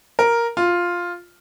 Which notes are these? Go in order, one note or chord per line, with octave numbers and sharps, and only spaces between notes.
A#4
F4